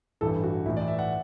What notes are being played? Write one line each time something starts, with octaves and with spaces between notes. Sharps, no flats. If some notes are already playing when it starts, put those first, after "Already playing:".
A1 G2 E3 A4
F#4
A1 A2 E3 E4
D5
E5
F#5